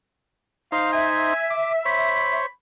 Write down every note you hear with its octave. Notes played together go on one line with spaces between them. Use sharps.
D#4 C5 F5
E5 G#5
D6
C5 C#5 B5